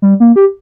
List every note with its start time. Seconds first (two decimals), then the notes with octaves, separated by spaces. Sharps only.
0.02 G3
0.20 A#3
0.36 G4